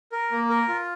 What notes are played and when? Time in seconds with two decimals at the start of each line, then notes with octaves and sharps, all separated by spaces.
0.12 A#4
0.31 A#3
0.50 A#4
0.68 F4